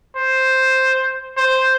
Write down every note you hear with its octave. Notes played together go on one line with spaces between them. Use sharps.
C5
C5